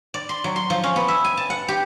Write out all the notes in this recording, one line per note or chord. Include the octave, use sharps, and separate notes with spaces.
D5
C6
F#3
C6
F3
C#4
B3
E5
G#5
A5
F#5
G4